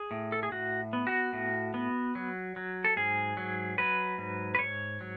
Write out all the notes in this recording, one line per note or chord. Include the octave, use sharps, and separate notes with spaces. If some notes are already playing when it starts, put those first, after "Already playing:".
Already playing: G#4
A2
A4
G#4
A2 F#4
B3
F#4
A2
B3
F#3
F#3
A4
G#2 G#4
F#3
F#3 B4
G#2
B4
G#2 C#5
F#3